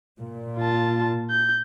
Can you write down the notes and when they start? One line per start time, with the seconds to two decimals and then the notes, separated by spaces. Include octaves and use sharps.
0.20 A#2
0.57 F4 A5
1.30 G6